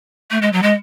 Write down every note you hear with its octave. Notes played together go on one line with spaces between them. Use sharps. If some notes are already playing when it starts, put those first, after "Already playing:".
A3
G#3
F#3
G#3